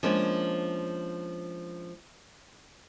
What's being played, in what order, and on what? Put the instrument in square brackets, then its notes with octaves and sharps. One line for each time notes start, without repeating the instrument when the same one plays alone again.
[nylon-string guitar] F3 G#3 A#3 C#4 D4